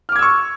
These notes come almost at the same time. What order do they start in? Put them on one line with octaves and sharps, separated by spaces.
F6 D6 G#6 E6 C#6